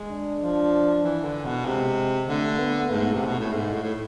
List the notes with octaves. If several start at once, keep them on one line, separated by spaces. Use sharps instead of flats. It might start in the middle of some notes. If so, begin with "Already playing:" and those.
Already playing: G#3
D4
F3
E3
D3
B2
C3 G#3
D3 A3
B3
G#2 A3
C3
B2
A2
G#2 G#3
A2
A2